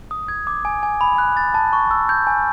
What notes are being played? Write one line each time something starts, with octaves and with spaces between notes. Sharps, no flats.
D#6
G#6
D6
G#5
G#5
B5
F#6
A6
A5
C#6
E6
G6
G#5